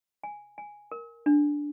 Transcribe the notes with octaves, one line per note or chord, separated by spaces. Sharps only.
G#5
G#5
A#4
D4